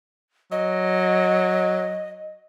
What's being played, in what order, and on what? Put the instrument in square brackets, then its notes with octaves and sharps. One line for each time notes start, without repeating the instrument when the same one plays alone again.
[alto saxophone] F#3 [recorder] D#5